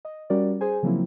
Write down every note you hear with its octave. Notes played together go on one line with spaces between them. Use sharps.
D#5
G3 C#4 F#4 A#4 D5
G#4 C5 G#5
C#3 F3 F#3 A#3 C4 E4